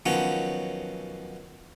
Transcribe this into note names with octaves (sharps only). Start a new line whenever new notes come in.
D#3 F3 F#3 B3 C#4